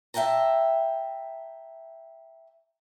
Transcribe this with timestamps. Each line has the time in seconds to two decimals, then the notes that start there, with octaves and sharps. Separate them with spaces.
0.14 E5 F5 G5 A5 A#5